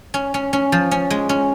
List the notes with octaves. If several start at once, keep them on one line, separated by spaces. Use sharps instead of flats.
C#4
C#4
C#4
F3
C#4
G#3
C#4